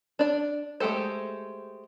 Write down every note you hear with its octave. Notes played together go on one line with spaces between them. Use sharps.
D4 D5
G#3 A3 G4 A4 C5